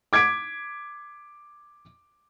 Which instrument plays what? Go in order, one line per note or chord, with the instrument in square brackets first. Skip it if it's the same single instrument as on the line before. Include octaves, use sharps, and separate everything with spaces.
[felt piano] D6 G#6 B6 D7